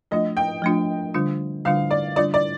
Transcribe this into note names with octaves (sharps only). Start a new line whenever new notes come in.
F3 A3 D4 F4 D#5
G5
F3 A3 D4 F4
D3 G3 D4 F4
D3 G3 D4 F4 F5
D5
D3 G3 D4 F4 D5
D5